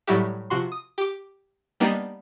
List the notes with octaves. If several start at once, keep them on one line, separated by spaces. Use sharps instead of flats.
A2 F#3 G3 E4 F#4 G4
C3 F3 F#4 C6
D#6
G4 D6
G3 A#3 B3 D4 D#4